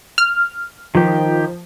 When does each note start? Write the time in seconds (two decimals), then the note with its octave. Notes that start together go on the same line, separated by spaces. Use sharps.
0.18 F6
0.95 D#3 F3 G4